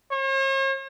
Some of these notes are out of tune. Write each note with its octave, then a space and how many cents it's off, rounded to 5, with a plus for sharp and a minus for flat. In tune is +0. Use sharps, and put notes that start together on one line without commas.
C#5 -45